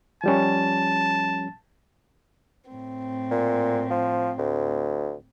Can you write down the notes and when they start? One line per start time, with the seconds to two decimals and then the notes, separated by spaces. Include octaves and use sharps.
0.24 F3 G3 C#4 A5
2.70 A2 C4
3.31 A#2
3.91 F3
4.38 D2